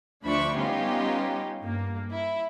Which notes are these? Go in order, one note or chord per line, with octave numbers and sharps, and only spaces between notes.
D2 F3 D4 E5 B5 C#6
G3 B3 C#4 D#4 F4 G4
G2 A#3
E4